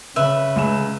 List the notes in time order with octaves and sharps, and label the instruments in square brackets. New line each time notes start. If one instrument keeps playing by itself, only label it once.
[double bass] C#3 [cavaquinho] B4 E5
[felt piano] C#2 E7